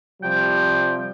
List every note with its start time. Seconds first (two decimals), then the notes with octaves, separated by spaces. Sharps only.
0.23 C3 F3 G3 G5